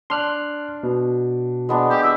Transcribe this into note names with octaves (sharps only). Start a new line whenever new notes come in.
D4 C6 F6 F#6
B2
G#3 B3 D4
G4 D6 E6
D#5 E5 F#5 G#5